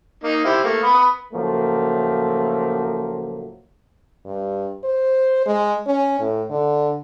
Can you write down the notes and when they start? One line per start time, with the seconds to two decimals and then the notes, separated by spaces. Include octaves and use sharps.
0.24 A#3 D#4
0.45 E4 G4 C5
0.64 A3 A#3
0.83 B4 B5 D#6
1.33 A2 C#3 F3 F#3 A3 A#3
4.25 G2
4.84 C5
5.46 G#3
5.86 C#4
6.20 A2
6.50 D3